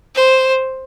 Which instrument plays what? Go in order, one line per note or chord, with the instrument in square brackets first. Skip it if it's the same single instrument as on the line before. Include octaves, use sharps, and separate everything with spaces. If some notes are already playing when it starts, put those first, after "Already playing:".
[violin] C5